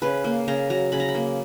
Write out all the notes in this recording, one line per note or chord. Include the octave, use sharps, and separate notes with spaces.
C#3 B4
A#3
C#3 A#5
F#3 A#5
C#3 B5
A#5
B5
A#3